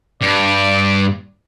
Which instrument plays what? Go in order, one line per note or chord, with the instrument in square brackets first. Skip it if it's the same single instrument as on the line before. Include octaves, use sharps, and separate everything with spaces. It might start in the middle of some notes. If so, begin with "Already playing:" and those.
[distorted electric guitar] G2 [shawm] D5